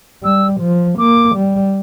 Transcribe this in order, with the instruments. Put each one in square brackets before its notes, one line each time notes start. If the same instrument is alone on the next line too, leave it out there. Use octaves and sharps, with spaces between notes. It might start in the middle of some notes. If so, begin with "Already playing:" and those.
[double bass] G3 [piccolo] E6
[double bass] F3
[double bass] A#3 [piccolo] D6
[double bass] G3